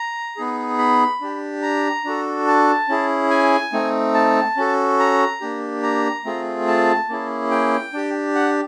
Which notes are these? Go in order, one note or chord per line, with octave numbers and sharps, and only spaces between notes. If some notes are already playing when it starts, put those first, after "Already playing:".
Already playing: A#5
B3 D#4 G#4
B5
D4 G4
A#5
D4 F#4 A4
A5
C#4 E4 G#4
G#5
A3 C4 D#4
A5
C#4 F#4 A4
A#5
A#3 D4 G4
A#5
A3 C4 F4 G#4
A5
A#3 C#4 E4 G#4
G5
D4 G4
F#5